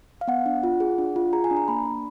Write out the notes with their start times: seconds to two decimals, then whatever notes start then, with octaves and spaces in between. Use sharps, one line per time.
0.21 F5
0.28 B3 F#5
0.46 D4
0.63 F4
0.80 G#4
0.98 D4
1.16 F4
1.33 G#4 A#5
1.44 G#5
1.51 D4
1.57 A#5
1.68 A#3 B5
1.86 D4